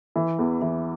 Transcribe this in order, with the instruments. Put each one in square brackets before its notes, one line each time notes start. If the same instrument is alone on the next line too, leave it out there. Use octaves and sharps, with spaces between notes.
[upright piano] E3
E2
E3